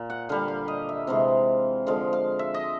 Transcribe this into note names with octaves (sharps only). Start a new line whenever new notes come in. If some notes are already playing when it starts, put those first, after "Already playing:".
Already playing: A#2
F#5
D3 G3 F5
F5
D#5
E5
C3 E3 G#3 F5
D3 F3 G#3 F5
F5
E5
D#5